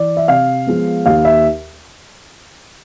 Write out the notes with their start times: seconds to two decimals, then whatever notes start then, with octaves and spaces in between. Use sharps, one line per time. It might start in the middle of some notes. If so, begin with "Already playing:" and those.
Already playing: E3 D5
0.17 E5
0.28 C3 F5
0.67 F3 G#3 B3
1.06 D#2 F5
1.25 E5